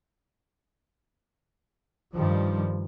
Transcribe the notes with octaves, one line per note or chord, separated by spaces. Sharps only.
G2 D#3 F3 G3